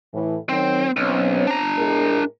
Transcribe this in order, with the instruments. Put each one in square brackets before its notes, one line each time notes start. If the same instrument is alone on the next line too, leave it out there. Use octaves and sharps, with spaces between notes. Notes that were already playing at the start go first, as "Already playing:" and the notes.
[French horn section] A2 E3
[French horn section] D#3 F#3 [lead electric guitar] C4
[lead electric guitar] B1 [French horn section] C4 C#4
[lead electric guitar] D4 A#5
[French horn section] A2 G#3 A#4